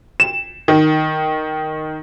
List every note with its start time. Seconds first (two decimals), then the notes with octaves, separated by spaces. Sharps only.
0.20 E7
0.68 D#3